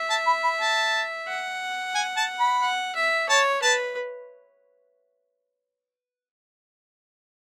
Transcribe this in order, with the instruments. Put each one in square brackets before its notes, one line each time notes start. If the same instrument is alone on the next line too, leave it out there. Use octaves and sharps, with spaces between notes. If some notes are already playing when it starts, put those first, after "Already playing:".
Already playing: [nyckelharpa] E5
[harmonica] A5
B5
B5
A5
[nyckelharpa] F#5
[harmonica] G#5
A5
B5
[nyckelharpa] F#5
E5
[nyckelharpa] C#5 [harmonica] A5
[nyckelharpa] B4 [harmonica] A5